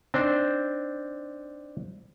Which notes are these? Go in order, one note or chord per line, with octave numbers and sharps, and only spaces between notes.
C4 D4 D#4 C5